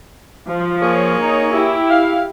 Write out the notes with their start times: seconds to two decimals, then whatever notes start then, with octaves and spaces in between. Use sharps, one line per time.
0.49 F3
0.82 A#3 G#4 C#5
1.21 D#4
1.52 E4 G4
1.89 F5